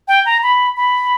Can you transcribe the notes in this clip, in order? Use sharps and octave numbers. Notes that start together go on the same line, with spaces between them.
G5
A#5
B5
B5